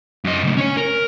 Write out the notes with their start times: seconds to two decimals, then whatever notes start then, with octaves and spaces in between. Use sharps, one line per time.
0.24 F#2 D#5
0.44 C#3 A3
0.57 C#4 C#5
0.77 A#4